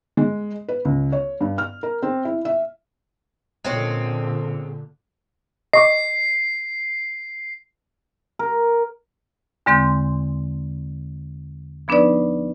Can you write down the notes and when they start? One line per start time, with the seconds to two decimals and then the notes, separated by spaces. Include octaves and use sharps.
0.17 G#3
0.68 B4
0.85 C#2
1.12 C#5
1.41 G2
1.58 F6
1.83 A#4
2.03 C4
2.25 E4
2.45 E5
3.64 A#2 D3 G#3 C4 C#4
5.73 D#5 C#6 D6 C7
8.39 A#4
9.66 E2 D3 G#3 C4 C6 G6
11.88 F3 B3 D4 D#4 B4 D5